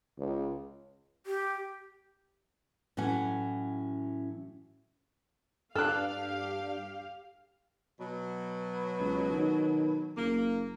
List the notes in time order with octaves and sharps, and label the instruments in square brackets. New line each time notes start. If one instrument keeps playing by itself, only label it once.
[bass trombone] C#2
[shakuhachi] G4
[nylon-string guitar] A2 E3 F#3 C#4 F#5
[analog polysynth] G2 D4 [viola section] G4 F5 [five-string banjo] A4 [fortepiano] F6 F#6
[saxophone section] B2 F#3
[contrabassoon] C#2
D#3
[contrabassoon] F#1 [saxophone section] A#3